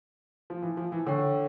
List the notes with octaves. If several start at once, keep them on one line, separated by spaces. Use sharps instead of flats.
F3
E3
F3
E3
D3 C#5 G5 C#6